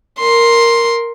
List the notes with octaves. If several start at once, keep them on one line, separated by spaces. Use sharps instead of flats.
A#4 C6